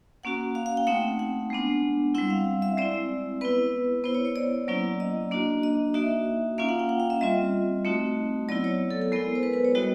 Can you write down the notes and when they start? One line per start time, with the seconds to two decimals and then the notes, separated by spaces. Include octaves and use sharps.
0.23 A#3 C#4 F#4 F#5
0.55 F5
0.66 F5
0.77 G5
0.87 A3 C4 D#4 F#5
1.19 F#5
1.50 G#3 B3 D4
2.14 G3 C4 E4 F#5
2.30 F5
2.62 E5
2.77 G#3 C4 E4 D5
3.41 B3 E4 B4
4.04 B3 E4 C5
4.15 C#5
4.25 C#5
4.36 D5
4.68 F#3 A#3 C#4 E4
5.00 D#5
5.31 A#3 D4 F#4
5.63 D#5
5.94 A#3 D#4 F#4 E5
6.58 A#3 C#4 F4 F5
6.69 F#5
6.79 G5
6.89 F#5
7.00 F5
7.10 E5
7.21 G3 C4 F4 D#5
7.85 A3 C4 D#4 F#4
8.49 F#3 B3 E4 D5
8.64 C#5
8.91 A4
9.02 A4
9.12 G#3 B3 E4 A#4
9.35 C5
9.43 B4
9.54 B4
9.65 C#5
9.75 G3 B3 D#4 F#4 D#5